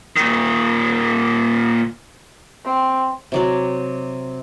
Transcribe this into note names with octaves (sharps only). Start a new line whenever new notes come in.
A#2 D#3
C4
C3 F#3 D5